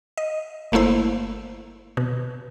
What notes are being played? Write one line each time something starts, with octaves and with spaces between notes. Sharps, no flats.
D#5
G1 A3 A#3 E4 C5
B2